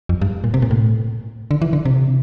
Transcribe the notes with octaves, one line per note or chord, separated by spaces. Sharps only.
F2
G2
A#2
C3
A#2
A2
D3
E3
D3
C3